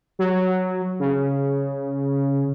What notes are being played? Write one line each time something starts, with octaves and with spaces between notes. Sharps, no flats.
F#3
C#3